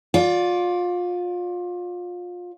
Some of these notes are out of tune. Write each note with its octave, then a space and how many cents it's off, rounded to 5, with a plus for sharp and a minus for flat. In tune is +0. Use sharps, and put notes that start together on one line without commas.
F4 +25 D5 -20